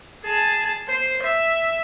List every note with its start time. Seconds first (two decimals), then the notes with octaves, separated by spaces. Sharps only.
0.24 G#4 A5
0.88 C5
1.22 E5